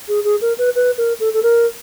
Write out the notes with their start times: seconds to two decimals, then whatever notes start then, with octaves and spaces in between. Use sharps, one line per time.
0.08 G#4
0.24 G#4
0.41 A#4
0.58 B4
0.76 B4
0.98 A#4
1.20 A4
1.34 A4
1.43 A#4